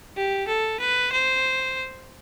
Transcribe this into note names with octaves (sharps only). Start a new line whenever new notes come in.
G4
A4
B4
C5